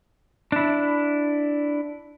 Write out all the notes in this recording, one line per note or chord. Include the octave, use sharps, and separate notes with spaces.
D4 E4